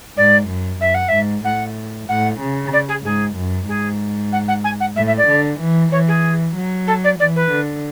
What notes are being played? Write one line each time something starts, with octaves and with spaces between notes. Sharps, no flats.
G#2 D5
F#2
F#2 E5
F#5
G#2 E5
A2 F#5
A2 F#5
C#3
D5
G#4
G#2 G#4
F#2
G#2 G#4
F#5
F#5
G#5
F#5
A2 E5
E5
D5
D3
E3
E3 C#5
G#4
F#3
A4
D5
E3 D5
B4
D3